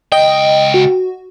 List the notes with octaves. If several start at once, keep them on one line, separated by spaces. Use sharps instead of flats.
C#2 D#5 G5
F#4